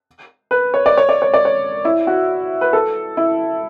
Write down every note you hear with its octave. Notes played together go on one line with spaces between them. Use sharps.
B4
C#5
D5
C#5
D5
C#5
D5
C#5
E4
F#4
B4
A4
E4